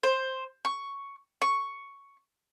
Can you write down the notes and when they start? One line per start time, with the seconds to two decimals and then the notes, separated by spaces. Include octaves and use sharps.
0.03 C5
0.65 C#6
1.42 C#6